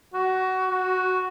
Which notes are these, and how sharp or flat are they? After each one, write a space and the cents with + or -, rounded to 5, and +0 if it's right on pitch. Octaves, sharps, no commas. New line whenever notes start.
F#4 +20
F#4 +0